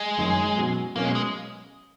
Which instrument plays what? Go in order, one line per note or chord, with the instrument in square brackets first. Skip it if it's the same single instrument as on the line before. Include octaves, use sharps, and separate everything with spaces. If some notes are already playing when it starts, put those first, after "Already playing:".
Already playing: [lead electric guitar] G#3
[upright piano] F#1 F#2 D#3
B2 F#3 C#4
[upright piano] B2 F#3 C#4 [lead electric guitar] A#3
[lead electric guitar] G#3
G#3